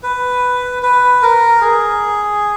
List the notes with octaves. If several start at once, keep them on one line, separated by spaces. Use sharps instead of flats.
B4
B4
A#4
G#4